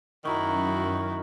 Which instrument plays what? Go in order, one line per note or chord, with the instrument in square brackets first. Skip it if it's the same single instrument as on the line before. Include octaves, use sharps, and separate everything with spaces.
[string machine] F#2 [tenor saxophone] D#3 [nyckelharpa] E4 F#4 [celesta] A#5 C#6